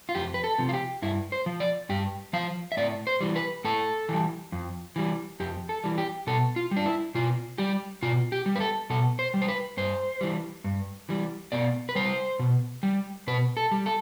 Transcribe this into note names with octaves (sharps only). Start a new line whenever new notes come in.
F4
F2 G4
B4
A4
C3 F3
F4
G4
G2 E4
C5
F3
D5
G2 G4
F3 F5
E5
A2 D5
C5
E3 G3
B4
A2 A4
E3 G3
F2
E3 G3
F2 G4
A4
E3 G3
G4
B2 A4
F4
G3
D4
E4
B2 F4
G3 G4
B2 F4
G4
G3
B4
A4
B2 A4
C5
G3
C5
B4
G2 C5
E3 G3
G2
E3 G3
B2 D5
B4
G3 C5
B2
G3
B2 B4
A4
G3
A4